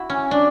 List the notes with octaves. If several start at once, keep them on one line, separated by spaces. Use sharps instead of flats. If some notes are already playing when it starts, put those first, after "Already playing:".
Already playing: E4 F#4
C#4
D4